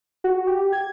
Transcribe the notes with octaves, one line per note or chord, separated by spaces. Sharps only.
F#4
G4
G#6